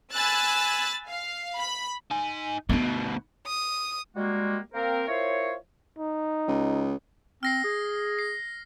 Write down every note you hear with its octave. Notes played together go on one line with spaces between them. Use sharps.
G#5 B5 E6 F#6 A6
F5
B5
D#4 G#5
D2 B2 B3 D#4
D#6
G3 G#3 A#3 F#4
A#3 C4 A#4 C5
E4 F4 A#4 C5 C#5
D#4
C#2
C4 F6 A#6 C7
G#4
C7